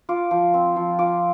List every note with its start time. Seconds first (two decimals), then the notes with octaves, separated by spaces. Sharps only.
0.09 F4 D6
0.31 F3
0.54 C4
0.76 F3
0.99 F4 D6